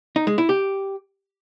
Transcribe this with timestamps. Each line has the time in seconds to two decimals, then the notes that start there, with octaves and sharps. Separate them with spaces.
0.16 D#4
0.27 G#3
0.38 E4
0.49 G4